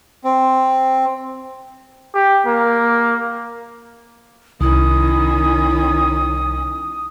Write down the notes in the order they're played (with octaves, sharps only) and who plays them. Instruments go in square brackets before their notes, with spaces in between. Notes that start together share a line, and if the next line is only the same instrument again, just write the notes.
[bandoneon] C4
[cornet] G4
A#3
[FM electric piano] C2 [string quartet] D#3 C#4 [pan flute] E4 [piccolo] D#6